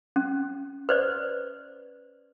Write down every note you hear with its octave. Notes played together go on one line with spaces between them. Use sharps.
C#4
B4 C5 D5